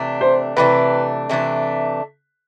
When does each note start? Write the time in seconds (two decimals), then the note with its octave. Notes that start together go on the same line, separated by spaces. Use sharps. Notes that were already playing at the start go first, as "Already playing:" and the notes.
Already playing: C3 E3 A3 D4
0.21 C5
0.57 C3 E3 A3 D4 B4
1.30 C3 E3 A3 D4